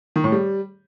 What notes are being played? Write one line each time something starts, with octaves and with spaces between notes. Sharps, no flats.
D#3
A2
G3